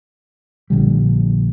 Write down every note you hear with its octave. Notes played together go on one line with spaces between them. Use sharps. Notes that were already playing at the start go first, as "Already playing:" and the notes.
A#1 D3 G3